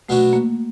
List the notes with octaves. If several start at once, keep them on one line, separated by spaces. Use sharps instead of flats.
B2 F#3 A3 B3 D4 F#4
A#3